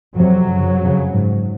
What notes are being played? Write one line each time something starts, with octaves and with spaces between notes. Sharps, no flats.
F2 C3 F#3
F#2 C#3
F2 C#3
G#2